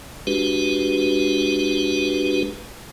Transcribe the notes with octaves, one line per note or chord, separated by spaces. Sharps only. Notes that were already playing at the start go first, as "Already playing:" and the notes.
G#3 D4 F#4 G4 B4